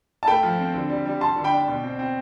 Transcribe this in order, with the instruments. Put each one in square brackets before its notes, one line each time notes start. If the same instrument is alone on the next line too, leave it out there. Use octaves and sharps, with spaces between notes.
[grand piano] A5
A3 G5 B5
F3
C4
D3
G3
G3
G3 A5 C6
D3
G5 B5
D4
B2
C4
C4